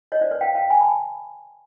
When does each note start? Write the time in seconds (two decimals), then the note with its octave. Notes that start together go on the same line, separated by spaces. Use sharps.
0.12 C#5 D#5
0.21 C5 D5
0.31 B4 C#5
0.41 F5 G5
0.55 F5 G5
0.70 G#5 A#5
0.80 A5 B5